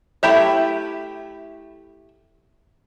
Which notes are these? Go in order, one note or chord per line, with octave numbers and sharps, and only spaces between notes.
A3 E4 G4 E5